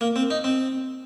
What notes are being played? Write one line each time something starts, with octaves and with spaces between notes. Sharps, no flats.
A#3
C4
D#4
C4